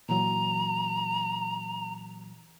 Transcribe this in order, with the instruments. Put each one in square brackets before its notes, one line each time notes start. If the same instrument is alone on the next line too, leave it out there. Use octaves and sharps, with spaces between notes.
[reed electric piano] A#2 E3 F#3 [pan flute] A#5